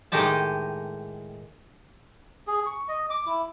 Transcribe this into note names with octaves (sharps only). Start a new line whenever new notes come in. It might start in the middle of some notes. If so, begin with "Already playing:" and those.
A2 D#3 G#3 G4 D#5 A5
G#4
C#6
D#5
D6
E4